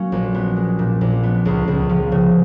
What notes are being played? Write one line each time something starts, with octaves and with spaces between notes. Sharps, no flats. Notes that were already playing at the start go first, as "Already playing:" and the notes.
Already playing: F#3 A#3 C#4
A#1
B3
G#3
A#2
A#1
B3
C#2
C#2
F3
C#3